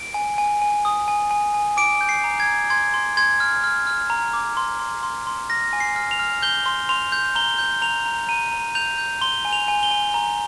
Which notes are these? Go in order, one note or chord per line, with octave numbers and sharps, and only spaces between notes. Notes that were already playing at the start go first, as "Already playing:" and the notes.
Already playing: D7
G#5
G#5
G#5
D#6
G#5
G#5
G#5
D6 D7
G6
C7
A#5
G#6
A#5
C6 G#6
C6
C6 G#6
F6
F6
F6
A#5
D6
C6
C6
C6
C6
F6 A#6
G#5
C7
F6
F7
F6
G6 G7
C6
C6 F7
G6
A#5 G7
G6
A#5 F7
A#5
A#5 D#7
A#5
G6 F7
G6
C6 G7
G#5
F7
G#5
G7
G#5
A#5